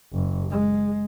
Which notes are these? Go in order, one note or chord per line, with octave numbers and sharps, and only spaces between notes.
F#1
G#3